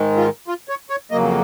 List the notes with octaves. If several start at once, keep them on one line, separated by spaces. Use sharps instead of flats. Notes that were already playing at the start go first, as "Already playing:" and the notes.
Already playing: G#2 D#3 G#3
F4
F4
C#5
C#5
F2 C#3 F#3 A#3 D#5